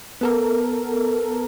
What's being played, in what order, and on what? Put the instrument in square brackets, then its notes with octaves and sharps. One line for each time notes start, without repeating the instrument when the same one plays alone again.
[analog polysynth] B3 A4 A#4